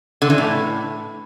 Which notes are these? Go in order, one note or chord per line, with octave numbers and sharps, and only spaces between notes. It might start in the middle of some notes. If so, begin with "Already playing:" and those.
D3
E3
A2